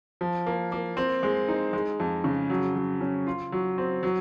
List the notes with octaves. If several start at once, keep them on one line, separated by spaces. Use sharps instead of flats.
F3
A#3
A#3
C4
G#3
D#4
G#3
F2
C#3
F#3
F#3
C#4
F4
F#3
C4
F#3